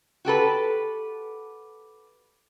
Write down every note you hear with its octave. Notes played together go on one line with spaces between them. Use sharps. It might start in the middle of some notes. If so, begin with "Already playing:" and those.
F#4 G4 A4 B4